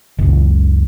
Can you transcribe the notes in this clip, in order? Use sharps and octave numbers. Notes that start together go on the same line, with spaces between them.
F#1 C#2